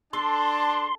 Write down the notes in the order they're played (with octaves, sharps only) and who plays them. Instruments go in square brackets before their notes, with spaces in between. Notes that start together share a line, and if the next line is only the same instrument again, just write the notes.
[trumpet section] D4 A5 [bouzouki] A4 [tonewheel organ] C6